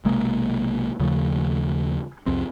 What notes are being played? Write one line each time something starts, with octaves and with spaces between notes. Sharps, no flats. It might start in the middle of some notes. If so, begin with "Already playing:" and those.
B1 C3 G#3 A#3
D#2 C#3 F3 A3
C2 F2 C4